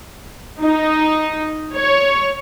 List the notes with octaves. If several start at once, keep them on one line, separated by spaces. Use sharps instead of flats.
D#4
C#5